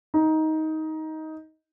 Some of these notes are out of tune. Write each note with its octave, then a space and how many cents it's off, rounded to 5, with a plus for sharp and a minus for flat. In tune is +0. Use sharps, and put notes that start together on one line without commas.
D#4 +15